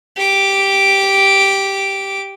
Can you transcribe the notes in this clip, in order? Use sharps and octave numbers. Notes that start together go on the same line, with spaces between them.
G4 D6